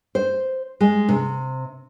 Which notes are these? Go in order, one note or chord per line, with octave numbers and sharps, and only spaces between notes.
C5
G#3
C3